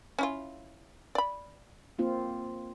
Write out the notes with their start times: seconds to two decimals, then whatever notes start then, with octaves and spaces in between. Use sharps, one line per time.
0.19 C#4 E4 F4
1.15 D5 B5
1.98 A#3 C4 F4